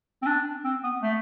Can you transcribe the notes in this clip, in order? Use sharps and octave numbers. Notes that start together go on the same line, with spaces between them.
C4
D4
C4
B3
A3